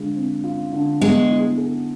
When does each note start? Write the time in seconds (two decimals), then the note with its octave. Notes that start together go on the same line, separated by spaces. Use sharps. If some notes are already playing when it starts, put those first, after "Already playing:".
Already playing: D3 G#3 F4
0.16 C4
0.44 F4
0.72 D3
1.01 G#3 B3
1.29 E4
1.57 G#4